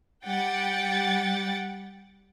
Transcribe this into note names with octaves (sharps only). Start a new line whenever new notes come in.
G3 F#5 G5 A6